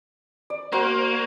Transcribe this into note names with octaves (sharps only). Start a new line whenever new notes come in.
D5
A#3 F#4 A#4 C5